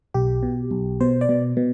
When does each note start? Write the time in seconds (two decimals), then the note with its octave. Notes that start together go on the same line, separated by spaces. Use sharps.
0.14 B1 G4
0.43 B2
0.71 B1
1.00 B2 C5
1.21 D5
1.29 B2
1.57 B2